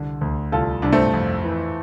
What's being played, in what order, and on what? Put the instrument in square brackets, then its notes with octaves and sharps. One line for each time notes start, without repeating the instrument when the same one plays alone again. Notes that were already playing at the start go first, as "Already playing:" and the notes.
Already playing: [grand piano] C2 D3
D2
[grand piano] C2 [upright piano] F4 A4
[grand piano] C2 [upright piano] D4
[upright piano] A3 C4
[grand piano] F2
E3